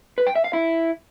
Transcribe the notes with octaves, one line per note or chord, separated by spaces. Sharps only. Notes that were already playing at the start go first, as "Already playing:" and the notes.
B4
G5
E5
F5
E4